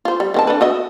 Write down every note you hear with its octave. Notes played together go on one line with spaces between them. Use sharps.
F4 C5
G3
D#3 C4 A5
D4 A4 B4
F#4 D#5 E5